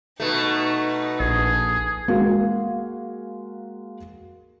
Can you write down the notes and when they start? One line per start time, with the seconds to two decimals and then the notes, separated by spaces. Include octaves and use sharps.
0.20 B2 A3 D#4
1.20 A#1 G#4
2.08 G#3 A#3 F#4 F5